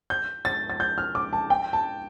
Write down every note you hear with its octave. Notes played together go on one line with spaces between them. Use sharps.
G6
A6
A6
G6
F6
D6
A5
G5
A5